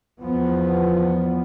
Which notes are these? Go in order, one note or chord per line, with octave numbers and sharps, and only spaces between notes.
E2 F3 B3